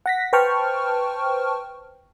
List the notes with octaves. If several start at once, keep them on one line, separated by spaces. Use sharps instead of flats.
F#5 A#6 B6
B4 C5 G5 A5 C#6 F6